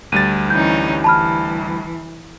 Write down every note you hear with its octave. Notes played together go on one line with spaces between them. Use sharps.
D2 G3 A6 D#7
E3 C#4 D#4 G6
E3 A5 B5 F6